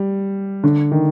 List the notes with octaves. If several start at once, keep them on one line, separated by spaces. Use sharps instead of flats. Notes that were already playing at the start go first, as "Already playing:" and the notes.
Already playing: G3
D3
D#3